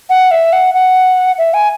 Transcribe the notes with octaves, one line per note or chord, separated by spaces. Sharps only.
F#5
E5
F#5
F#5
E5
G#5